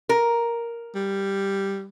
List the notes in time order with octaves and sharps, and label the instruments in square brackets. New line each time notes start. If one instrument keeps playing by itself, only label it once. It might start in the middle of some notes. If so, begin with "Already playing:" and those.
[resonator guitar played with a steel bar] A#4
[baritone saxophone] G3